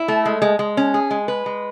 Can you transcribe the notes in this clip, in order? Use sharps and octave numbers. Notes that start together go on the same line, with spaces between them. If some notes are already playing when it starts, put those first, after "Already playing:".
Already playing: E4
A3
G#3
G#3
G#3
C#4
G#4
G#3
B4
G#3